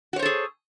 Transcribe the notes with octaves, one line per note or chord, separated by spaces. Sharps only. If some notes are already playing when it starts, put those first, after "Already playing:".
F#4 G#4 A4 C5 C#5